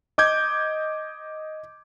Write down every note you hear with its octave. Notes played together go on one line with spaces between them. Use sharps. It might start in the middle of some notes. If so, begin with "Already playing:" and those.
D#5 D6 G6 G#6